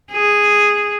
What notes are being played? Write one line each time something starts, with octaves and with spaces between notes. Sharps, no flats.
G#4